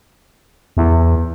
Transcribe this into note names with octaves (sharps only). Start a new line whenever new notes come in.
E2